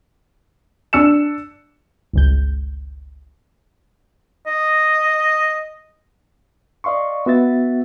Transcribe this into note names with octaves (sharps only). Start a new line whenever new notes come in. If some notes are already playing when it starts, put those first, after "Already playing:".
D4 E6 C#7 E7
G1 C#2 G6
D#5
D5 D#5 F5 C6 C#6
B3 F#4 E5 A6